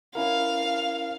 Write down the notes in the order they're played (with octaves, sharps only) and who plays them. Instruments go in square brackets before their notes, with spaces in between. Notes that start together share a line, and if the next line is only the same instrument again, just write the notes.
[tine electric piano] C#4 E4 A#4 [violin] F5